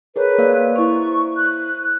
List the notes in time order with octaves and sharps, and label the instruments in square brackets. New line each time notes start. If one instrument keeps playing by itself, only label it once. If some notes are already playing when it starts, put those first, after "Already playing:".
[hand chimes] G#4 A#4 C#5 [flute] B4
[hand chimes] A#3 D5 F5
[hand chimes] E4 C5 [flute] C#6
[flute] F#6